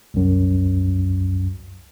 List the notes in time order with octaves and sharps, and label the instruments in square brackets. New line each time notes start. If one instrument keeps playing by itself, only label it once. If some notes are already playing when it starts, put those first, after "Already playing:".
[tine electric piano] C2 F#2